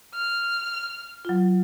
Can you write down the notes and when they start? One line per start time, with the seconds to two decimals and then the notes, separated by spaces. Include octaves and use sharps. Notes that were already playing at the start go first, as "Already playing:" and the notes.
0.15 F6
1.25 F#3 F4